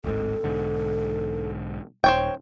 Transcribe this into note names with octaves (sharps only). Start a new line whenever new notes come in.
D1 G#1 G#2 A4
B1 G#2 D3
D#1 C5 C#5 G5